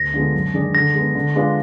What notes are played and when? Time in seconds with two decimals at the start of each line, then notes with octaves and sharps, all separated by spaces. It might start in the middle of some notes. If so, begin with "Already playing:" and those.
Already playing: D2 A#6
0.14 D3 F3 G#3 B3
0.34 F#2
0.54 D#3 G#3 D4 G#4
0.74 D3 A#6
0.95 G#3 B3
1.15 D3
1.36 G#3 D4 F4 B4